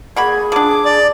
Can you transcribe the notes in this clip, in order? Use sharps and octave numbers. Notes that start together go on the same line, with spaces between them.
A#3 F#4 G#4 B5 G#6
F3 D4 D6
D5